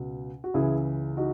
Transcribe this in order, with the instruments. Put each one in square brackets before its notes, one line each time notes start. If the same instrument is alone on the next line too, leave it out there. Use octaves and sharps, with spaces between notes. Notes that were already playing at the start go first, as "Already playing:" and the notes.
Already playing: [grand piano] C#2 B2
F#4
C#2 C#3 E3 E4 G#4
D#4 F#4